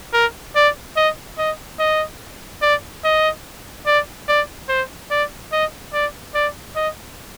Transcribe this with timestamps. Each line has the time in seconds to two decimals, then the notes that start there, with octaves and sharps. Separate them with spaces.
0.13 A#4
0.56 D5
0.96 D#5
1.38 D#5
1.79 D#5
2.62 D5
3.04 D#5
3.86 D5
4.28 D5
4.69 C5
5.11 D5
5.52 D#5
5.93 D5
6.34 D5
6.76 D#5